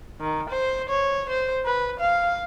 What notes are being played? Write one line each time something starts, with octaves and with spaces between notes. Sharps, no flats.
D#3
C5
C#5
C5
B4
F5